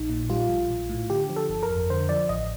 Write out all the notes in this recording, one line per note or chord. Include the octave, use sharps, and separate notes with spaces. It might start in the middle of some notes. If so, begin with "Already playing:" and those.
Already playing: A#1 D#4
A#2
G3 F4
A#1
A#1
A2
D3 G4
F3
A4
G1
A#4
F2
D3 C5
F3 D5
A1 D#5